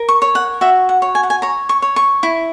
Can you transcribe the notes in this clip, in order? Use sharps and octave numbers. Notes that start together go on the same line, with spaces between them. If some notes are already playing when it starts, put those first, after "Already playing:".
Already playing: A#4
C#6
C#5
F#5
F#4 E5
F#5
C#5
G#5
F#5
G#5
C#5 A#5
C#6
C#5
C#6
E4